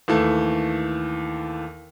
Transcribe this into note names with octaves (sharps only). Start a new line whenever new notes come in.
D#2 E3 A3